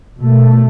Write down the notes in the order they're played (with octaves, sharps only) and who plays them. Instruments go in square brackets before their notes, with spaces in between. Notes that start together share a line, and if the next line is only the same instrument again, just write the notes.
[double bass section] B2 A3